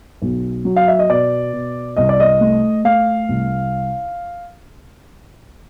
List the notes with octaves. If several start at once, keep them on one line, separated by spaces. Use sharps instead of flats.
B1
F#3
F5
E5
D#5
B2 D5
B2
C2 D#5
D5
D#5
A3
A3 F5
C2